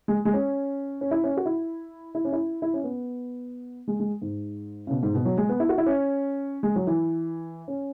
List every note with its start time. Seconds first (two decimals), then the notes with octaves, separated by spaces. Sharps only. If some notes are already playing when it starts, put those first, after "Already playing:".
0.08 G#3
0.25 G#3
0.34 C#4
1.01 C#4
1.11 E4
1.24 C#4
1.37 F#4
1.46 E4
2.15 E4
2.25 C#4
2.32 E4
2.62 E4
2.74 C#4
2.83 B3
3.88 G#3
4.00 G#3
4.22 G#2
4.87 C#3
4.90 B2
5.03 G#2
5.15 B2
5.25 F#3
5.37 G#3
5.49 B3
5.60 E4
5.69 F#4
5.78 E4
5.86 C#4
6.63 G#3
6.76 F#3
6.87 E3
7.68 C#4